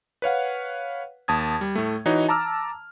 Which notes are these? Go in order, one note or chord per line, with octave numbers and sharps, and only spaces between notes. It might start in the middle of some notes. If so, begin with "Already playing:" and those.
B4 C#5 F5 F#5
D#2 A5 D#6 G#6
G3
A2 A3
E3 D#4 F#4 C#5 D#5
A5 A#5 D6 E6 F6